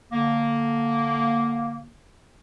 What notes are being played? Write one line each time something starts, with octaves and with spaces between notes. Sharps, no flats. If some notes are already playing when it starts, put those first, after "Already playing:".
D3 A#3